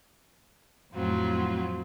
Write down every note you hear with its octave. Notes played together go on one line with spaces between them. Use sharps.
F2 A2 F#3 C4 F4